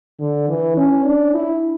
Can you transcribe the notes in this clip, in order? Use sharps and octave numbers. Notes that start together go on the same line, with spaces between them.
D3
E3
C#4
D4
E4